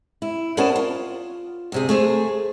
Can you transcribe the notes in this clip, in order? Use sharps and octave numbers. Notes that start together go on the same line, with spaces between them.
E4
B3 C#4 A#4 C5 D5 A5
F4
D2 C3 G#4
A3 G#4 C5